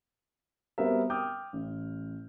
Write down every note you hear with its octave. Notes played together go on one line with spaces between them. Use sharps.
G3 B3 C4 F#4 A#4 E5
G5 D6 D#6 F6 G6
A1